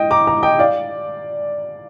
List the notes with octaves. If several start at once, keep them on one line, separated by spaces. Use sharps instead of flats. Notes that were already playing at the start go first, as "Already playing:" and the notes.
Already playing: D#5 G5
A#5 D6
A#5 D6
D#5 G5
D5 F5